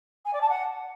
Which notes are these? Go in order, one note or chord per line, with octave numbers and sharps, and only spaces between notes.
G#5
D5
A5
F#5